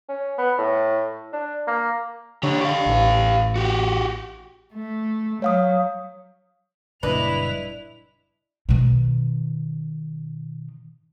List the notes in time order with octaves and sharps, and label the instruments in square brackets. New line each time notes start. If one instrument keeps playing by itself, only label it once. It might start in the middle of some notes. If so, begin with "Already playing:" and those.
[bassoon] C#4
B3
A2
D4
A#3
[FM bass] D3 [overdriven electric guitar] G4 C#5
[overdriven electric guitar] G4 F5
[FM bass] A1
[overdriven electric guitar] F#4 G4
[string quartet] A3
[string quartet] F#3 [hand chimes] C#5 F5 D#6
[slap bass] F#1 A#2 G3 [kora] D4 D#5 [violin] E4 F7 [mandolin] B4
[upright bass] B2 D#3